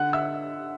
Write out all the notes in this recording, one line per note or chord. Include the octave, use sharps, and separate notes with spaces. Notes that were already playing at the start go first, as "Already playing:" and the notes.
Already playing: D3 F#5 F#6
E5 E6